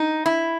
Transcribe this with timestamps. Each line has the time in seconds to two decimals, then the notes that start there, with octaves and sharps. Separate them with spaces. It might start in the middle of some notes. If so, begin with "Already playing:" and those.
Already playing: D#4
0.26 E4